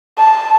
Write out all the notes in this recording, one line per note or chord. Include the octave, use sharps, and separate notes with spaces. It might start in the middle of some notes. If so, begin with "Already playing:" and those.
A5